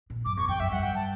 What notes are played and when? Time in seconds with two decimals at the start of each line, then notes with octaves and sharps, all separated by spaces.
0.10 A#2
0.25 F#2 D6
0.37 E2 C#6
0.48 F2 G5
0.60 F#2 E5
0.72 G2 F#5
0.83 G5
0.95 A5